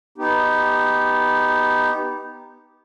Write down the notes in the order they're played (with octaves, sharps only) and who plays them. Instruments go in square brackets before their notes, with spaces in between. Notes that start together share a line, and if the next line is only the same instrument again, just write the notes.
[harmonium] B3 D#4 G4